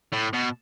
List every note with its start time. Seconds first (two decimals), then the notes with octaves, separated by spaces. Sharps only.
0.12 A2
0.33 B2